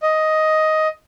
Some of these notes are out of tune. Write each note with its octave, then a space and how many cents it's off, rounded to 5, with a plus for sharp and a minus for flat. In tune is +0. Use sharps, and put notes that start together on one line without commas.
D#5 +10